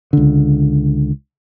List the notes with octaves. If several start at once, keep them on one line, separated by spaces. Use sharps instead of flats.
C#2 D3